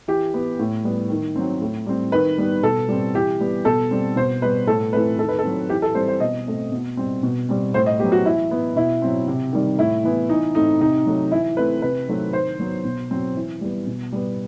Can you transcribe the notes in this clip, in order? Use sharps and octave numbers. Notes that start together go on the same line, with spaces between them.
E3 G4
B3
A2
G3 B3
D#3
F#3 C4
A2
G3 C4
D#3 B4
G3 B3
B2 A4
G3 C4
E3 G4
G3 B3
B2 A4
G3 C4
B2 C5
G3 B3 B4
A2 A4
E3 A3 C4 B4
D#3 A4
B4
A4
F#3 C4
E3 G4
A4
G3 C4 C5
C5
B2 D#5
A3 C4
B2
G3 C4
B2
G3 C4
A2 C5
D#5
F#3 B3 G4
F#4
E3 E4
B3
B2 E4
F#3 C4
C3
D#3 G3
A2 E4
E3 B3
E3 D#4
A3 C4 D#4
C3 D#4
F#3 A3
E3 E4
A3 C4 B4
C3 B4
D#3 F#3 A3 C4
D#3 C5
F#3 B3
B2
F#3 C4
E3
G3 B3
B2
G3 B3